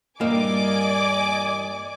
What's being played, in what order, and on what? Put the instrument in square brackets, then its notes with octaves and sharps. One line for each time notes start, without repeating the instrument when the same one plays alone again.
[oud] G2 A#2 E3 [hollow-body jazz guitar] A#3 [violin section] D5 G#5 D6 [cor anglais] D#5